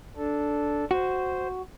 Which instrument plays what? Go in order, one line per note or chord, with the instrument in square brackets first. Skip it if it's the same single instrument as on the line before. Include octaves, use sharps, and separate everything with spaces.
[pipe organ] D4 A4
[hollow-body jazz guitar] F#4 [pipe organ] C5